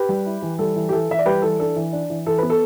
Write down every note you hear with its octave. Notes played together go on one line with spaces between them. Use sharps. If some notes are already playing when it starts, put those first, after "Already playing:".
Already playing: G4 B4
G3
E4
E3
G3 A4
E3
G4
E3 A4
E3 E5
D5
G3 G4 B4
E3 A4
D4 A4
E3
D4
E3
E3 A4
B3 B4
A4